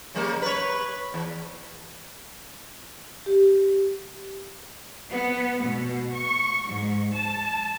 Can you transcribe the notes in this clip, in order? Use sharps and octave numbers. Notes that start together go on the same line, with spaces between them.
C#3 G3 A#3
B4 C#5
E2
G4
B3
B2
C#6
G#2
A5